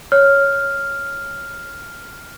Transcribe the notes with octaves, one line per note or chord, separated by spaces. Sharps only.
C#5 F6